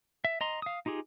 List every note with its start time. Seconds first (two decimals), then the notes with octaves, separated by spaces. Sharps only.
0.25 E5
0.41 D#5 A#5 C6
0.62 F5 D#6
0.86 D#4 F4 G4 G#4